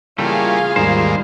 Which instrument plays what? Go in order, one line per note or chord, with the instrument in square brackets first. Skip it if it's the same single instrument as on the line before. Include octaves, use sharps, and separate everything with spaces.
[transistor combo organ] C#3 E3 A#3 [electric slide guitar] G3 A3 [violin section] F4 G#4 F5
[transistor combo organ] D#2 G#2 A#3 [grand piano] G3 D#4 [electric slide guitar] C5